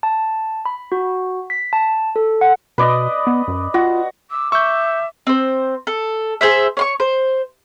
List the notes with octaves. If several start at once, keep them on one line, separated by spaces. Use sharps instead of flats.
A5
B5
F#4
B6
A5
A4
F#5
B2 B4 D5 D#5
B3
F#2
F4 F#4
D6 E6
E5 C#6 E6 G6
C4 C5
A4
G#4 C5 E5
C#5 C6 C#6
C5